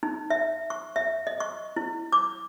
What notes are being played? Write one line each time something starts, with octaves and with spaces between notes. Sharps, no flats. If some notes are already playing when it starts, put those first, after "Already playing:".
D#4
E5
C#6
E5
D#5
C#6
E4
D6